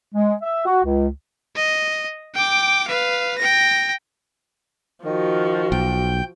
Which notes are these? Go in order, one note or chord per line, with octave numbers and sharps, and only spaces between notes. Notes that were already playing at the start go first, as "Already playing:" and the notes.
G#3
E5
F#4
C#2
D#5
G5 D6
B4 F5
G5 A#6
D#3 F3 F#4
B1 G5 G6